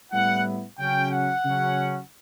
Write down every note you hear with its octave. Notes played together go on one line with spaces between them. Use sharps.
A2 G3 B3 E4 F#5
C#3 F#3 C#4 G5
F#5
C#3 F#3 C#4